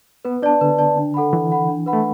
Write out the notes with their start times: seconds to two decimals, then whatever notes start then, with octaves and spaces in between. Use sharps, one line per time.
0.25 B3 B4
0.42 D4 D5 A5
0.61 D3 B4
0.78 D5 A5
0.97 D4
1.14 A4 F#5 B5
1.33 E3 D4
1.50 A4 F#5 B5
1.68 D4
1.86 B4 F#5 B5
1.93 A3